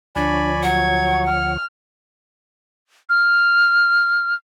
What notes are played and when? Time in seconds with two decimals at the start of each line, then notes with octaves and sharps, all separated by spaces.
0.16 D2 F3 D4 C#5 D5 G#5 B5
0.63 F#3 F#5 G#6
1.28 F6
3.09 F6